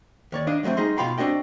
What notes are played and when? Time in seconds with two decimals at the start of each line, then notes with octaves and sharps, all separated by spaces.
0.32 D#2 C#5 D5
0.47 D4 D#5 F5
0.63 D#3 F#3 G#3 A3 C4
0.77 G3 D#4 G#4 D#5 C6
0.98 B2 F4 F5 G5 B5 C6
1.18 C4 D4 F#4 D#5 G5